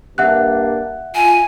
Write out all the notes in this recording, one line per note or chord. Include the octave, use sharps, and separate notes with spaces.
G2 A#3 D4 E5 F#5 F#6
F4 G#5